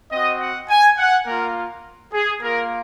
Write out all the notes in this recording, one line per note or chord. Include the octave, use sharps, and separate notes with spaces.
C4 F#4 D#5
F#5
G#5
F#5
A#3 F4 A#4
G#4
A#3 F4 A#4